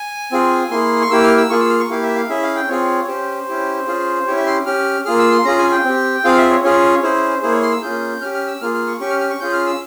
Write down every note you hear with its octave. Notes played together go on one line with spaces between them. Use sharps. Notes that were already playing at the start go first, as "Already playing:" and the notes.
Already playing: G#5
C4 F4 G#4
A#3 E4 G#4 C6
C#6
A#3 E4 G4 E6
F6
E6
A#3 F4 G#4 C#6
E6
F6
C#6
A#3 E4 G4 F5
E5
F5
C#4 E4 G#4 E5
F5
G5
C4 F4 G#4 C#5
C#5
C#4 G4 C5
C#4 E4 G4
C#4 F4 G#4
C#4 E4 G4 C#5
E5
C6
C#4 G4 F6
A#3 F4 G#4 F6
E6
C6
C#4 F4 G#4 A#5
G#5
G5
C4 G4
C4 F4 G#4 F5
E5
C#5
C#4 F4 G#4 C#5
C#4 E4 G#4 C5
A#3 E4 G#4 C5
C#5
C6
E6
A#3 C#4 F4 G#4 G6
C#4 G4 F6
F6
E6
A#3 F4 G#4 F6
F6
C#6
C#4 G4 C#6
F6
F6
C#6
C#4 F4 G#4 G6
F6
E6